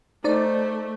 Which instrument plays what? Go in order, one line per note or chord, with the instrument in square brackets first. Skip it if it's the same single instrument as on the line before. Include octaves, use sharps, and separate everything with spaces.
[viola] A3 [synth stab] D#4 D5 [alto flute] C5